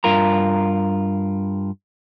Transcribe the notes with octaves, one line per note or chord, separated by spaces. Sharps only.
G2 F4 A#4 A#5